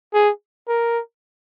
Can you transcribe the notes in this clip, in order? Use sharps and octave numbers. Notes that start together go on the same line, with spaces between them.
G#4
A#4